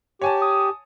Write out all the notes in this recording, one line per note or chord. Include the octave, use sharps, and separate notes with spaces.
G4 C#5 G#5 A5
D#6